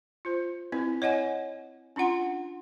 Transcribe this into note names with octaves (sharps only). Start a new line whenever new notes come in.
F4 C5
C4 E4 B4
C#5 D#5 F#5 G#5
C#4 D4 F4 F#5 C6